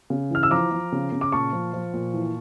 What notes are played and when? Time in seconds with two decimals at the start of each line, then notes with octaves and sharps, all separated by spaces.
0.10 C#3
0.30 E3 F6
0.43 E6
0.51 F3 A#5 D6
0.71 F3
0.92 C#3
1.12 C#3
1.21 D6
1.32 A#2 A5 C#6
1.53 F3
1.74 F3
1.93 A#2
2.14 E3